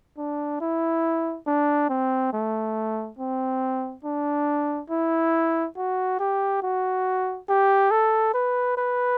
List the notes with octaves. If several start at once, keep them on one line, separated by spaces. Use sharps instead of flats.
D4
E4
D4
C4
A3
C4
D4
E4
F#4
G4
F#4
G4
A4
B4
B4